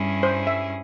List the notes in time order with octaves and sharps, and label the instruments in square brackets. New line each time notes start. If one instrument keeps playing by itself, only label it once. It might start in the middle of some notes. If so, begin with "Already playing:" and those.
Already playing: [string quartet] G2 G3 C#4 E4 G#4
[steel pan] C5
E5